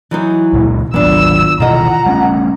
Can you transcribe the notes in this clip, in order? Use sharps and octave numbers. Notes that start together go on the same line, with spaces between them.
E3 F#3 D#4
C#2 A#2 G#3
G#1 D#3 F#3 B3 D4 F4 E6
B2 D#3 E3 F4 D#5 F#5 A#5
G3 A3 C#4